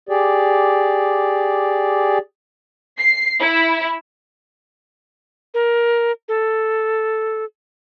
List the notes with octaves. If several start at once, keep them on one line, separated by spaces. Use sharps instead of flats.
G4 G#4 D5
C7
E4
A#4
A4